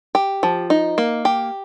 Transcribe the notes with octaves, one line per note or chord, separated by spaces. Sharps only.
G4
F3
D#4
A#3
G4